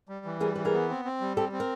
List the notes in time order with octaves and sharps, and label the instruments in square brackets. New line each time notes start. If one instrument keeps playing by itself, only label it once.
[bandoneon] G3
E3
[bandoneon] G3 [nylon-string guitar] G#4 A#4
[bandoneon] E3 [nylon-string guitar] B4
[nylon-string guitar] G#4 A#4
[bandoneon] B3
C4
C4
G3
[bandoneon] C4 [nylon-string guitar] G4 A4
[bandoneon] C4
[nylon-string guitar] A#4